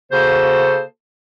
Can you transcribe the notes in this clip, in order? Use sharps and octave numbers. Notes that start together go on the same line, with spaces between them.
C#3 A#3 F#4 A4 C5